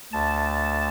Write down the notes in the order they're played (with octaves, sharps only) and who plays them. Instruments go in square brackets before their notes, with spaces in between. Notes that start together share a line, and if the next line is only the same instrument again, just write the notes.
[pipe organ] D2 A5